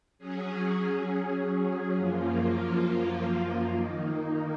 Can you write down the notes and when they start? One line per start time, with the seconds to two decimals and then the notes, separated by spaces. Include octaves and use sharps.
0.18 F#3 C#4 G#4
1.95 F#2 F3 A#3 F4
3.71 D#3 A#3 D#4